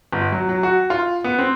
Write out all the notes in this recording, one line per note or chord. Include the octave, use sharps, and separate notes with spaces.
G1
F#3
F#3
F#4
F4
B3
C4